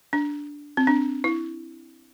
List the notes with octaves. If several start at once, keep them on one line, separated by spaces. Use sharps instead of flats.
D4
C4
D4
E4